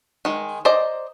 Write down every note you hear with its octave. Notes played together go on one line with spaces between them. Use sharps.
D#3 G#3
C5 D5 D#5 A#5